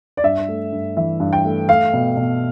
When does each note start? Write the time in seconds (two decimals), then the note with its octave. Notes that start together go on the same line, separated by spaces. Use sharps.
0.17 D5
0.23 G2 E5
0.48 A3
0.72 G2
0.97 E3 E5
1.20 G2
1.33 G5
1.45 A3
1.68 A3 F5
1.93 B2
2.17 B2